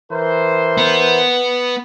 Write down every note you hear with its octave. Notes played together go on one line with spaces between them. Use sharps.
E3 A#4 C5
B3